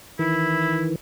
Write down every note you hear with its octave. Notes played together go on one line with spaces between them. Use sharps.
D#3 E3 E4